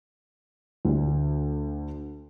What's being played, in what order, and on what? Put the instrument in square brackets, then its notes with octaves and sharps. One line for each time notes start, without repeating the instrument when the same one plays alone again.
[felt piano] D2 D3